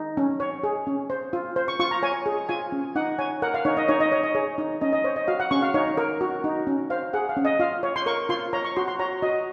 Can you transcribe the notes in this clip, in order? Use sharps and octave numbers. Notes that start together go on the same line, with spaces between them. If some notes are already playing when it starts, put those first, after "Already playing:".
Already playing: D#4
C#4
C#5
G#4
C#4
C5
F4
C5
C#6
F4 C#6
A#5
C#5 G#5
G#4
F4 G#5
C#4
D#4 F#5
C#5 G#5
A#4 F#5
F5
D#4 C#5
D#5
D#4 C#5
D#5
C#5
D#5
G#4 C#5
D#4
C#4 D#5
D#5
C5 C#5
D#5
F#4 F5
F#5
C#4 C#6
F5
D#4 C#5
A#4
F#4
D#4
C#4
C5 F5
G#4 F#5
F5
C#4
D#5
F4 F5
C#5
C6
A#4 C#6
F4 C6
C#5 A#5
C#6
F#4 C6
C6
C#5 A#5
F#4 D#5